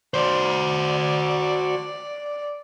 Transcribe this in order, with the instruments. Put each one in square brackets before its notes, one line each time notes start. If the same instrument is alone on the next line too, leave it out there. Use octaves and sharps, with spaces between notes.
[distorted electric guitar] F#4 C5 [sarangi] D5